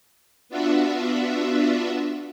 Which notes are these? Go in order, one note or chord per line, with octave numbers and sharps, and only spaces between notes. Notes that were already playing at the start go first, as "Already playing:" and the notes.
B3 D4 F4 F#4 E5